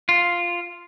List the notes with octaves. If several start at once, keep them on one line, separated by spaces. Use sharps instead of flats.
F4